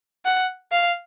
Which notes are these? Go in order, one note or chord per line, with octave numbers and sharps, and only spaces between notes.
F#5
F5